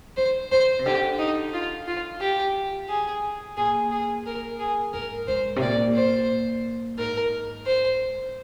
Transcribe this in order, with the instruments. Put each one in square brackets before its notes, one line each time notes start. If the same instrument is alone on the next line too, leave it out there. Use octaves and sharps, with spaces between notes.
[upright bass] D#3 [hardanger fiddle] C5
[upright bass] D#3 [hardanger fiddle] C5
[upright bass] C3
[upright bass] D3 [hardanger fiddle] G4
[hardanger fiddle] D#4
F4
F4
G4
G#4
[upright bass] A#2 [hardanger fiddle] G#4
[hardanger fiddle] G#4
A#4
G#4
[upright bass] G#2 [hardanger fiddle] A#4
[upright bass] G#2 [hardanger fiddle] C5
[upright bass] C3
[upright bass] A#2 [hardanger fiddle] D5
[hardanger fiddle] C5
[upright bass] G#2 [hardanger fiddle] A#4
[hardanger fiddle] C5